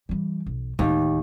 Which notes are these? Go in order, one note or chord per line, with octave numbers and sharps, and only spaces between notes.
E3 G3
B1
D1 D#2 G#3